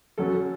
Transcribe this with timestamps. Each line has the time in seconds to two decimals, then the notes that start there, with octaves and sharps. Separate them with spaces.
0.18 F#2 F#3 C#4 A4